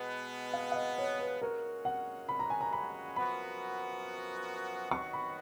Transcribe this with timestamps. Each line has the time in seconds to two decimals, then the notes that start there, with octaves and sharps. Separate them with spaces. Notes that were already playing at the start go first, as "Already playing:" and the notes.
Already playing: B2 G#3 B3
0.53 F5
0.72 F5
0.76 D#5
0.98 C#5
1.19 B4
1.41 A#2 G#3 C#4 F#4 A#4
1.85 F#5
2.29 B5
2.39 A#5
2.50 G#5
2.61 A#5
2.73 B5
3.16 F#2 F3 B3 F#4 A#4 B5
4.91 D#3 F#3 B3 F#4 C#6
5.13 B5